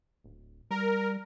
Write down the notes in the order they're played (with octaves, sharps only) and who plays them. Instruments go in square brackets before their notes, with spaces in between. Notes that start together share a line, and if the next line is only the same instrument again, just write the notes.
[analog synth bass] D1
[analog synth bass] G3 [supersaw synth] A#4